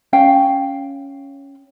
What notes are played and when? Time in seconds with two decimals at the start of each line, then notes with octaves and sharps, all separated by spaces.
0.13 C#4 F5 G5